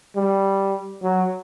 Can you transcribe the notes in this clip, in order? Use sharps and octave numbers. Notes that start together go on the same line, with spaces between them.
G3
F#3